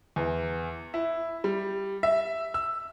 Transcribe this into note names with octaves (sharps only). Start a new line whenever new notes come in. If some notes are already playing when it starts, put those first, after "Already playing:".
E2
E4
G3
E5
E6